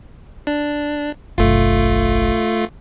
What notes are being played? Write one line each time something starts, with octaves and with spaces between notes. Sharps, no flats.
D4
F#1 B1 A3 F4